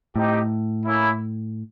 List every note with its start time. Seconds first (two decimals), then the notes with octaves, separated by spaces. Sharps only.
0.15 A2 C4 D#4 G4
0.85 A#3 C#4 E4